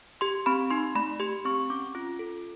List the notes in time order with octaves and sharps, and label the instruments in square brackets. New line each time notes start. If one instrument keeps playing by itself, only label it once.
[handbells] G4 C6
C4 B5
D#4 C6
A3 B5
G4 C6
C4 C#6
C#4 D6
F4
A4